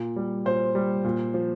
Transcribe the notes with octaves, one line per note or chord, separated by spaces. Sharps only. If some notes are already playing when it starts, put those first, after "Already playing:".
Already playing: A#2
G3
A#2 C5
G3
A#2
F3